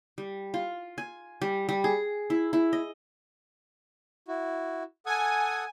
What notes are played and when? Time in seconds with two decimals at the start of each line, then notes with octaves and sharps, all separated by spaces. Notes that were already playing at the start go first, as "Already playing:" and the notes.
0.18 G3
0.54 F4
0.98 G#5
1.42 G3
1.69 G3
1.84 G#4
2.30 E4
2.53 E4
2.73 D#5
4.28 E4 F#4
5.06 A4 F#5 G#5 D#6